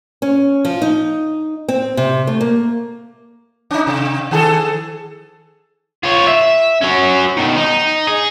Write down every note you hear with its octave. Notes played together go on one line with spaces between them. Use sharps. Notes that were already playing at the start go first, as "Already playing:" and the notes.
C#4
F3
D#4
C4
C3
A3
A#3
C#4 D#4
C3
D#3 G#4 A4
F4 C#5
E5
F#3 C#4
B2 D#3
D#4
G#4